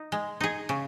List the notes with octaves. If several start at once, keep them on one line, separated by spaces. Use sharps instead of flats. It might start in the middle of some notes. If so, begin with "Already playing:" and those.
Already playing: D#4
G#3
D#4 G#4
C#3